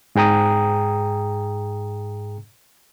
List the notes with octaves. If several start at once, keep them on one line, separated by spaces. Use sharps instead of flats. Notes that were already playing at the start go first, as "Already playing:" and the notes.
G#2 G#4 G5 A#5 D#6